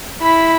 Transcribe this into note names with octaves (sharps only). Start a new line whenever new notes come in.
E4 B5